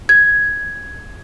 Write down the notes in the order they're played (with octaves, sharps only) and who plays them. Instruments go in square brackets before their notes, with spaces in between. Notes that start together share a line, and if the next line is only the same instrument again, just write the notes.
[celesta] G#6